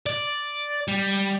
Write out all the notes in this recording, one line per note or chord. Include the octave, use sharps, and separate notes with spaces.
D5
G3